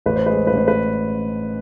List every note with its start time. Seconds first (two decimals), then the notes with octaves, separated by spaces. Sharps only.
0.06 A1 B4
0.16 C5
0.26 G#3 B4
0.37 C5
0.47 B4
0.53 A1 C5
0.68 B4